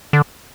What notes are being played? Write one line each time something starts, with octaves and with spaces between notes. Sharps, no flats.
D3